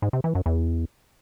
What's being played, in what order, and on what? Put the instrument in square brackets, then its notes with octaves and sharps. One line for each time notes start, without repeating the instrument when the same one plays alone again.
[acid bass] G#2
C3
E3
F#2
E2